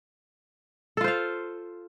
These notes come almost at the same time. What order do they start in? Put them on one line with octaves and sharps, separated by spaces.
A4 F4 C5 F5